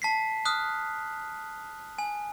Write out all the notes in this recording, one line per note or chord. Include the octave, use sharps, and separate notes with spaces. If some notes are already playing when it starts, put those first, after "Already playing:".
A5 B6 C7
D#6 F6 F#6
G#5